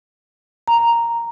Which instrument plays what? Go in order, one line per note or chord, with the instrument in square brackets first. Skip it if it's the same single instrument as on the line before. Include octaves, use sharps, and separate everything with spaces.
[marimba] A#5